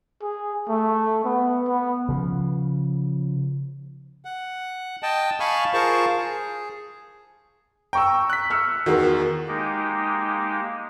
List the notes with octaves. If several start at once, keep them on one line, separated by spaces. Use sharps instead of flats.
G#4
A3
B3
B3
C#3 F3
F#5
D#5 G5 A5
F5 G#5 A5 B5 C#6 F6
F4 G#4 A#4 C5 A5 C#6
G#4
G5 A#5 C#6 E6
F#6 B6
E6 F6 C#7
E2 D#3 F#4 G#4 A#4
G#3 A#3 D#4 G4